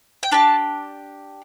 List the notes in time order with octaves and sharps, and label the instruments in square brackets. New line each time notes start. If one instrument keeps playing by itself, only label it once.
[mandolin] G5
D4 G4 A5